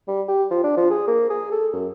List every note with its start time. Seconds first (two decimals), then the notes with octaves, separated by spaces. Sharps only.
0.08 G3
0.28 G4
0.51 F3
0.64 D4
0.77 F3
0.90 G#4
1.08 A#3
1.30 G#4
1.52 A4
1.73 F#2